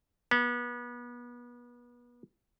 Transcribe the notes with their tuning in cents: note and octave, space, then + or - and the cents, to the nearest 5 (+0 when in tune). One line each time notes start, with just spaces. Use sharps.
B3 -30